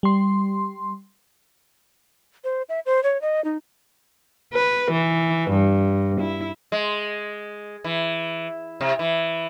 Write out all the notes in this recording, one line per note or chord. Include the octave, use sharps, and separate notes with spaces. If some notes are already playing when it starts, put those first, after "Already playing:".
G3 C6
C5
E5
C5
C#5
D#5
D#4
B4
E3
G2
E4
G#3
E3
C3
E3